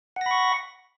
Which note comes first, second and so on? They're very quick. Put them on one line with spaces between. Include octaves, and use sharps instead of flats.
F#5 A#6 B5 C#6